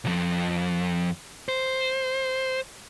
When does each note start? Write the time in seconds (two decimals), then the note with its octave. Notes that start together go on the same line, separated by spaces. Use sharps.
0.05 B1 F2
1.49 C5